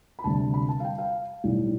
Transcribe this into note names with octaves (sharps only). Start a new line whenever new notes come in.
B5
D2 C3 G3 A5
B5
A5
F5
G5
F5
B1 A2 G3